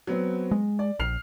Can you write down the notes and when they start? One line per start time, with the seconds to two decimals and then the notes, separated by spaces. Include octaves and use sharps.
0.07 F#3 B3 C4
0.51 G#3
0.79 D5
0.99 A#1 F6 C7 F7